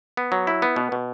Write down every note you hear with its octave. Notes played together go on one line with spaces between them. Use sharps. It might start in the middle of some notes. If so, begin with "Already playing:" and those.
B3
F#3
E4
B3
B2
B2